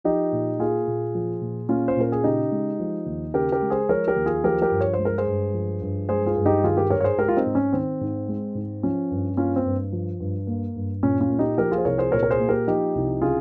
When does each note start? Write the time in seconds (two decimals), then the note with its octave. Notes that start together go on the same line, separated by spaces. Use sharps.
0.04 F3 D#4 G4
0.32 A#2
0.59 A#3 F4 G#4
0.87 A#2
1.15 F3
1.41 A#2
1.69 A#3 C#4 F4
1.88 C5
1.96 A#2 A#4
2.12 G#4
2.24 C#3 D#4 G4
2.52 G#3
2.80 F3
3.06 D#2
3.34 C#3 G4 A#4
3.52 G4 A#4
3.62 G#3
3.70 G#4 C5
3.89 F3 A#4 C#5
4.07 G4 A#4
4.16 D#2
4.26 F4 G#4
4.44 F3 G4 A#4
4.62 G4 A#4
4.71 G2
4.81 C#5
4.93 C5
4.99 G#3
5.05 A#4
5.18 G#4 C5
5.27 G2
5.54 F3
5.82 G2
6.09 G#3 G#4 C5
6.26 F4 G#4
6.36 G2
6.46 D#4 G4
6.64 D#3 F4 G#4
6.77 G4 A#4
6.90 G#2 A#4 C#5
7.01 C#5
7.04 G#4 C5
7.18 G#3 G4 A#4
7.28 F4
7.37 C4 D#4
7.46 G#2
7.55 C#4
7.73 D#3 C4
8.01 G#2
8.28 G#3
8.55 G#2
8.83 F3 C#4
9.11 G2
9.37 A#3 C#4 F4
9.56 C4
9.65 G2
9.92 F3
10.20 G2
10.47 A#3
10.75 G2
11.03 A#2 C#4
11.21 C#4 F4
11.30 A#3
11.39 D#4 G4
11.58 F3 G4 A#4
11.72 F4 G#4
11.78 C5
11.85 C2 A#4 C#5
11.98 G#4 C5
12.12 A#2 A#4 C#5
12.23 A#4
12.30 G#4 C5
12.39 A#3
12.49 G4 A#4
12.67 F3 D#4 G4
12.95 C2
13.22 C#3 F4 G#4